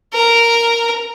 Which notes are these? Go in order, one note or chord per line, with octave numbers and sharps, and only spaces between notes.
A#4